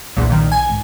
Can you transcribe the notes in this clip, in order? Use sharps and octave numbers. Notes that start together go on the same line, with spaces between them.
A#1 E2 A#2
B1 A#2 D#3 F3
G#5
G#2 G#3